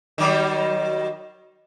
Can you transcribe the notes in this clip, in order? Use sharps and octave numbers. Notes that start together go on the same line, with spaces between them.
D#3 F#3 G3